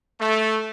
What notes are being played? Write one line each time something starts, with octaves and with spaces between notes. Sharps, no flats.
A3